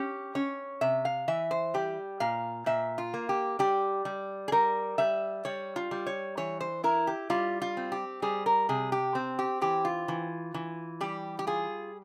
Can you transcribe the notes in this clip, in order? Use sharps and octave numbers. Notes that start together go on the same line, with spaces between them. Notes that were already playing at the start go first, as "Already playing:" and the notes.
Already playing: C#4 G4
C#4 C#5
C3 E5
F5
E3 E5
C5
G3 G4
A#2 F5
A#2 E5
F4
A#3
G4
G3 G4
G3
G#4
G3 A#4
G3 E5
G3 C#5
F4
G3
C#5
E3 C#5
C5
E4 A#4
G4
G3 F4
F4
C4
G4
G3 G#4
A#4
C3 G#4
G4
C4
G4
E3 G4
F4
E3
E3
G3 G4
G4
F4 G#4